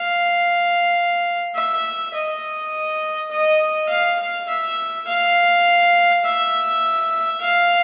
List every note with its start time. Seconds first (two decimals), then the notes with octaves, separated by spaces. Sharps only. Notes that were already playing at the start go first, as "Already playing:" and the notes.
Already playing: F5
1.55 E5
2.14 D#5
3.31 D#5
3.89 F5
4.19 F5
4.48 E5
5.07 F5
6.24 E5
7.42 F5